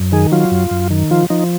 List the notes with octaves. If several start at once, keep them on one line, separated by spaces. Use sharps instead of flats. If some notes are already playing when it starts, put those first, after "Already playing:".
Already playing: F#2
D#3 G#4
F#3 F4
F#2
F#2
D#3
F3 F4
F3 D#4